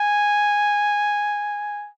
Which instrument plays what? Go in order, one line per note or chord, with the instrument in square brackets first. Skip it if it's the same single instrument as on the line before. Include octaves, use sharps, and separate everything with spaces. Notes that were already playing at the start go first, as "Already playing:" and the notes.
Already playing: [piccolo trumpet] G#5